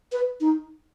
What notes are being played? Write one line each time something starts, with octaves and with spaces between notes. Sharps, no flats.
B4
D#4